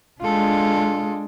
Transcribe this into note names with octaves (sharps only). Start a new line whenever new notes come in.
G#3 D4 F4 A4